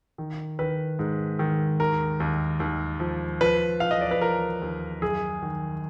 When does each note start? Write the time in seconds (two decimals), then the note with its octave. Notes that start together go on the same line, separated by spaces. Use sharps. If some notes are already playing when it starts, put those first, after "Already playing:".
0.18 D#3
0.59 D#3 B4
0.99 G#2
1.39 D#3
1.80 D#2 A#4
2.20 D#2
2.60 D#2
3.00 F3
3.41 F3 B4
3.80 F3 F5
3.91 D#5
4.01 D5
4.11 B4
4.21 F3 A#4
4.62 D#2
5.02 F#2 G#4
5.42 D#3